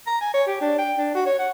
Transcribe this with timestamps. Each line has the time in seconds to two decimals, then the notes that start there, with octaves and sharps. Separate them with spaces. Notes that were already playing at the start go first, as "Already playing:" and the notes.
0.07 A#5
0.21 G#5
0.34 C#5
0.47 G4
0.61 D4
0.78 G5
0.98 D4
1.15 F#4
1.26 C#5
1.39 F#5